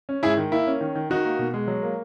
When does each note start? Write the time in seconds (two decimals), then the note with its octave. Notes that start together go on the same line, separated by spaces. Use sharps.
0.09 C#4
0.23 G#2 E4 G#4
0.37 D#3
0.52 A#3 E4
0.67 C#4
0.81 D#3
0.95 D#3
1.10 D#3 D#4 F#4
1.25 A#3
1.39 B2
1.54 G#3
1.68 F#3
1.83 A#3